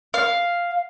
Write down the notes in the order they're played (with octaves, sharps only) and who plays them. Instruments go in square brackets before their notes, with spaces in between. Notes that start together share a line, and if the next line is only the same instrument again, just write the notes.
[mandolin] F5